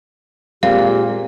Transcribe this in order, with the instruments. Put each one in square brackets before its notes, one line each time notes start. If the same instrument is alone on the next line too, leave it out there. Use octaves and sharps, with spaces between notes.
[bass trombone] A#2 [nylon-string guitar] G#3 C4 F4 [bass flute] G4 [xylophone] F5